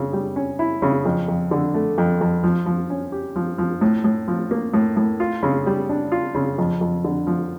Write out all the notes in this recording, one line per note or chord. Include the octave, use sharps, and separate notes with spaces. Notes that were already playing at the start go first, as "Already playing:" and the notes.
Already playing: C#3
G3
C#4
E4
C#3
F2
F2
D3
A3
F2
F2
F3
F3
C#4
G4
F3
F3
A2
A2
F3
A#3
A2
A2
F4
C#3
G3
D4
F4
C#3
F2
F2
D3
F3